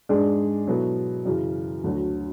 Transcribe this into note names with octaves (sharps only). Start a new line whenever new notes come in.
G#2 G#3 D4 G#4 D5
B2 F#3 B3 E4 A4
F#2 C#3 E3
D2 D3 F#3